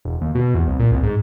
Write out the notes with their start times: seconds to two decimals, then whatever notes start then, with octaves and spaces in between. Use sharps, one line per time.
0.05 E1
0.21 D#2
0.35 B2
0.54 E2
0.67 C2
0.79 A#2
0.91 C2
1.03 G#2